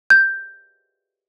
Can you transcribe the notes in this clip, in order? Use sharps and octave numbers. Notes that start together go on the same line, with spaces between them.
G6